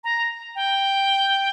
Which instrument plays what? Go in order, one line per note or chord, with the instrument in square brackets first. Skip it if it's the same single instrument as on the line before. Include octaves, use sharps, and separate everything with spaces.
[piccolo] A#5
G5